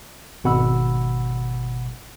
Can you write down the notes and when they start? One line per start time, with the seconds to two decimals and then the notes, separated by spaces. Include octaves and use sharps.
0.44 G#1 B2 F#5 B5 E6